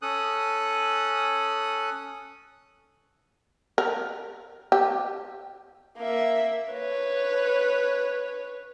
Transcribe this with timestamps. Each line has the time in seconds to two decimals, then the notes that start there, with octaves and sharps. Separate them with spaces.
0.02 C#4 A4 D#6 F#6
3.78 A#4
4.72 G4
5.98 A#3 E5
6.71 B4 C#5